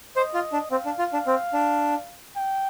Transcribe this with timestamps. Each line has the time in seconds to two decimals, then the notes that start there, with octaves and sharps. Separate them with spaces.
0.16 C5 D#5
0.34 F4
0.53 D4
0.71 C4 F5
0.85 D4
0.99 F4
1.13 D4
1.27 C4
1.53 D4
2.37 G5